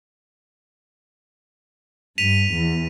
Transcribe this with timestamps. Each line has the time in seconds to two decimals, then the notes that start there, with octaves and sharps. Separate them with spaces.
2.18 G2 B6 D#7 F7
2.53 E2